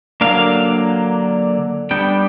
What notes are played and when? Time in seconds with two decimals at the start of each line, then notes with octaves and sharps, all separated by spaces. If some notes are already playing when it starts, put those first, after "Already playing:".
0.21 D3 F#3 A#3 D4 F5
1.91 G3 B3 D4 G5